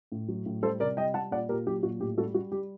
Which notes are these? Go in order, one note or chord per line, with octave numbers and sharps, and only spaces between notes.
A2
F#3
A2
G3 A4 C5
C3 A#4 D5
G3 D#5 G5
G3 F#5 A5
A#2 D5 F#5
A#2 G4 A#4
F#3 G4
A#2 F#4
A2 G4
G3 F#4 A4
G3 F#4
G3 G4